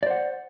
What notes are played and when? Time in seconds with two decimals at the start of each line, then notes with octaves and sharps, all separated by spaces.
0.03 D5
0.06 C5
0.10 F#5